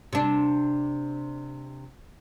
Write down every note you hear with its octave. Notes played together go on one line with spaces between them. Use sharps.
C3 D4